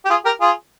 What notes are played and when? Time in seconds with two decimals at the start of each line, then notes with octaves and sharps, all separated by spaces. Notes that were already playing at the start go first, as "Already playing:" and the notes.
0.05 G4
0.10 F4 G#4
0.25 G4 A#4
0.41 F4 G#4